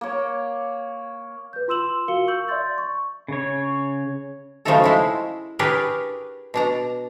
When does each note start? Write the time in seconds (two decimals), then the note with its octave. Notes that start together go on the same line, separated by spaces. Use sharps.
0.01 A#3 C#5
1.53 B4 G6
1.68 F4 C6 E6 E7 F#7
2.08 F#4 A#4 F5 C#7 G7
2.27 C#6 E6 G6 F#7
2.48 D5 E5 C6 G6 A6
2.78 C#6
3.28 C#3 C#5
4.65 C#3 F3 F#3 A3 D#4 A4
4.84 G#3 E4 C5
5.59 D4 G4 G#4 A#4 B4 C#5
6.54 B2 D4 A#5